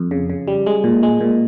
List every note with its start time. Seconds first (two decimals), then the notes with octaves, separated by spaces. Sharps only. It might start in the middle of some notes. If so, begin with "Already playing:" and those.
Already playing: F2
0.11 C#3
0.30 C#3
0.48 G3
0.66 G#3
0.84 A#2
1.03 G#3
1.21 A#2